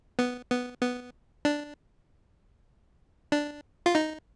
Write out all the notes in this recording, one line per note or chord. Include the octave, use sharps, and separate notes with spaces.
B3
B3
B3
D4
D4
F4
D#4